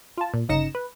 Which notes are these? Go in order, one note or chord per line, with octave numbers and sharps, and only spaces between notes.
F4 A5
A#2
G1 C#3 D#4 A#6 C#7 E7
B4